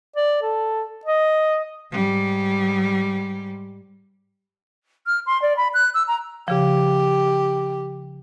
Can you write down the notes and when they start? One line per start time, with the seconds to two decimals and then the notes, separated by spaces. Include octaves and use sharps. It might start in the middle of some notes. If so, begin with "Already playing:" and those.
0.16 D5
0.42 A4
1.05 D#5
1.91 G#2 G3
5.06 F6
5.26 C6
5.42 D5
5.57 B5
5.74 F#6
5.94 E6
6.07 A#5
6.48 C#3 F3 G4